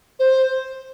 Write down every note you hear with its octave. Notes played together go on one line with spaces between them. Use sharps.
C5